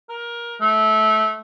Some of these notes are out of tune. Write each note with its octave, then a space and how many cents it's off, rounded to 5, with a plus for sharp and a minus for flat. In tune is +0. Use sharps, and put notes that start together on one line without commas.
A#4 +20
A3 -20